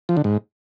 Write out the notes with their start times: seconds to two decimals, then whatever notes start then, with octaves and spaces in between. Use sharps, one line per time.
0.09 F3
0.17 D3
0.24 G#2